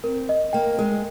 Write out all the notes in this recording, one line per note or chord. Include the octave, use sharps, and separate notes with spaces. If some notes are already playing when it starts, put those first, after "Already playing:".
C4 A#4
D#5
A#3 G5
G#3 A#4